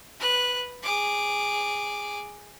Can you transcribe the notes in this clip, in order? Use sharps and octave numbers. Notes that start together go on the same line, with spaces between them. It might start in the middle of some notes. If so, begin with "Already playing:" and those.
B4 F#6
G#4 D6